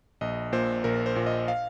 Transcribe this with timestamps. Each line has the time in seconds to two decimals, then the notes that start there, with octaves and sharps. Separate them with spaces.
0.21 A#1 D#5
0.53 A#2 C5
0.84 A#1 A#4
1.06 C5
1.16 A#2
1.27 D#5
1.48 F5